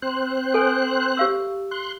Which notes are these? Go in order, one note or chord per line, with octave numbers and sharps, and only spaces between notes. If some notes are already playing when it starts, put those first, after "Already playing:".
C4 C5 F#6
A4 B4 G#5
G4 F5 E6
C6 F#6